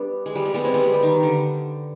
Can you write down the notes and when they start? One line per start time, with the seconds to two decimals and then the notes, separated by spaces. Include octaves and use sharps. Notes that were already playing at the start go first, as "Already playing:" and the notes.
Already playing: G3 B3 D4
0.26 G#3
0.35 G3
0.45 G#3
0.54 G3 B3
0.64 G#3 C4
0.74 G3 B3
0.84 G#3
0.93 G3
1.03 D#3
1.23 D3